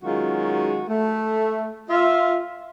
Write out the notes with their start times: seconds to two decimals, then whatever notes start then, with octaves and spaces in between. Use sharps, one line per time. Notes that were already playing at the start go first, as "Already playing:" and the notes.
0.03 D#3 F#3 G#3 C#4 F4 F#4
0.88 A3
1.90 F4 E5